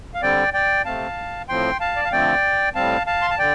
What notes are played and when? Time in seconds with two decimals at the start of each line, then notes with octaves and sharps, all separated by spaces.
0.14 F5
0.22 D3 G3 C4 D5 G5
0.54 D5 G5
0.85 C3 A3 C4 F5 A5
1.49 A2 F3 C4 G5 C6
1.80 F5 A5
1.96 D5
2.05 F5
2.12 D3 F3 A3 C4 D5 G5
2.75 A2 G3 C4 F5 A5
3.07 F5 A5
3.22 C6
3.30 A5
3.38 D3 D5 G5